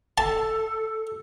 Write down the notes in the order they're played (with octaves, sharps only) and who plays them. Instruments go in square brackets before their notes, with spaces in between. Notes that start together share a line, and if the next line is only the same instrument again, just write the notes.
[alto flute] A4 [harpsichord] A5